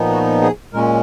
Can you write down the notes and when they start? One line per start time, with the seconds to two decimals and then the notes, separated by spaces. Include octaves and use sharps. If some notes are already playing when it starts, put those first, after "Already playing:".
Already playing: A#2 F3 B3 D#4
0.09 F#4
0.42 G#4
0.73 A#2 G#3 C#4 A#4